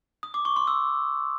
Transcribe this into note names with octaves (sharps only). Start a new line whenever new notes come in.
D#6
D6
C#6
C6
E6